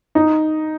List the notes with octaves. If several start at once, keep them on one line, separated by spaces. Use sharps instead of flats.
D#4